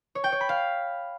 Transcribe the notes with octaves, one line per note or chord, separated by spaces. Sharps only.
C#5
G5
C#5
B5
F5